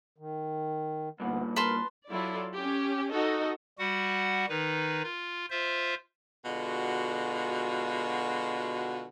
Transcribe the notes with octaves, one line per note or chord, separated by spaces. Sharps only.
D#3
D2 G2 A#2 B3
A#4 B4 A5 C6
F#3 E4 F4 A4 D5
C#4 G4
D#4 F#4 A4 D#5
G3 F#4 F#5
D#3 D#4 B4
F4
F4 C5 E5
B2 D3 G#3 F4 F#4